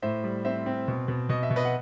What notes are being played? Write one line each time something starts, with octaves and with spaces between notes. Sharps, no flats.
A2 C5 E5
G3
C4 C5 E5
C4
B2
B2
B2 D#5
E5
B2
B4 D#5
F#5